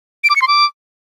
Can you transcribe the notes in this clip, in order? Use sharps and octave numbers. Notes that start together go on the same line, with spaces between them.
D7
D6
C#7
C6
D6